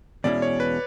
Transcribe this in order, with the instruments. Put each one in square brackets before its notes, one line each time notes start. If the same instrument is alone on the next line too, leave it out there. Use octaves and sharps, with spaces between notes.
[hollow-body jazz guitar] E2 B2 G#3 C#4 E4 [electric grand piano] D5
[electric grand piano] C#5
B4